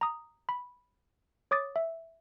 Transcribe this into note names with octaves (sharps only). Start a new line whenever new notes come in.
A#5 D#6
B5
C#5 D6 D#6 A6
E5